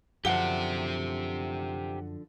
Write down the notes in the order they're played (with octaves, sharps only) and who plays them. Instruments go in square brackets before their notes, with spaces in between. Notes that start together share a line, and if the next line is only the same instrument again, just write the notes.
[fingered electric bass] F#2 [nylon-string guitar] D3 F3 D4 [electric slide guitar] G4 C5 [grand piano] F#5 G7